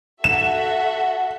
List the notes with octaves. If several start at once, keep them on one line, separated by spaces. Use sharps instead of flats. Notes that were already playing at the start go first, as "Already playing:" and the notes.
F#4 A4 E5 F#5 E7